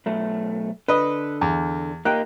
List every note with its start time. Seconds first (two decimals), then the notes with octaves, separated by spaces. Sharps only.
0.06 B1 A3
0.88 D3 B4 D#5
1.41 E2
2.05 A#3 D#4 G4 G5 F#6